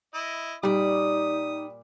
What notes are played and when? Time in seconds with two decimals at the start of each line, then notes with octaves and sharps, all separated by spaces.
0.14 E4 D#5
0.63 A#2 G3 D#4 D5 D#6